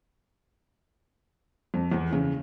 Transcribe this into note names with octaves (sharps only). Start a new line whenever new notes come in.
F2
E2
C#3